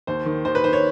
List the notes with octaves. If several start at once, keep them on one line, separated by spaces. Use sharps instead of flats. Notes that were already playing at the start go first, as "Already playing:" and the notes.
D#2 C5
D#3
D#2 C5
B4
D#3 C5
C#5